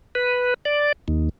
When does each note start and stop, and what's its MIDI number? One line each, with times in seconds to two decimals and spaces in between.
0.15 0.54 71
0.65 0.92 74
1.08 1.29 39